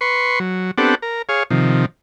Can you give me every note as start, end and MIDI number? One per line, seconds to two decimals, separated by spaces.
0.01 0.39 71
0.01 0.39 84
0.01 0.39 85
0.40 0.71 54
0.78 0.95 59
0.78 0.95 60
0.78 0.95 62
0.78 0.95 67
0.78 0.95 69
0.78 0.95 78
1.02 1.22 70
1.29 1.43 68
1.29 1.43 73
1.29 1.43 77
1.50 1.86 48
1.50 1.86 51
1.50 1.86 53